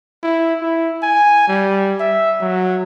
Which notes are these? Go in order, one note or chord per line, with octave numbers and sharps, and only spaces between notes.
E4
E4
G#5
G3
E5
F#3